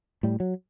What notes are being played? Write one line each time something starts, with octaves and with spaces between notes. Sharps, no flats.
A2 G3
F#3